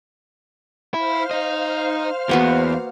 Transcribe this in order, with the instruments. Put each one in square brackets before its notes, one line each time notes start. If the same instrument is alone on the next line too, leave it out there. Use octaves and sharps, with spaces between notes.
[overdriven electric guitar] E4 [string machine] C5 F5 F6
[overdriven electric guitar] D#4 D#5
[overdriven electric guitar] E2 [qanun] A#3 B3 F#4